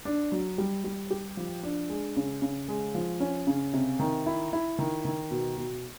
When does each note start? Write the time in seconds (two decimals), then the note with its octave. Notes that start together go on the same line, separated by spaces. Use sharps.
0.05 D4
0.32 F#3
0.58 G3
0.84 G3
1.11 G4
1.37 F3
1.63 D4
1.89 G#3
2.16 C#3
2.42 C#3
2.68 G#3
2.95 F3
3.20 C#4
3.47 C#3
3.74 C3
3.99 D#3
4.26 E4
4.53 E4
4.79 D#3
5.05 D#3
5.31 B2
5.58 B2